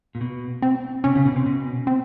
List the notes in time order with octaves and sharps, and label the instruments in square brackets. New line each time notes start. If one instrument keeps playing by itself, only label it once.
[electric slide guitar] A#2
B2
[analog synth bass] C4
[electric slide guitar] C3 [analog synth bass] C#4
[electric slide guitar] C#3
B2
C3
B2
[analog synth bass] C4